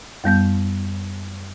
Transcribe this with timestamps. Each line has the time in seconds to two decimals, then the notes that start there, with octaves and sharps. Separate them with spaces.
0.24 F#2 G3 B3 G6